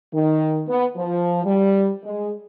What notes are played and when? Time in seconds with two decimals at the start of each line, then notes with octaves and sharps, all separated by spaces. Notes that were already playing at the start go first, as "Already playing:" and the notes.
0.13 D#3
0.68 B3
0.96 F3
1.44 G3
2.04 G#3